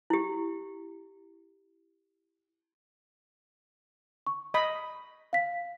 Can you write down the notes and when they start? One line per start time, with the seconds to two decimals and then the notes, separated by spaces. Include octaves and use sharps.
0.10 E4 G4
4.27 C#6
4.54 D#5 B5
5.33 F5 B6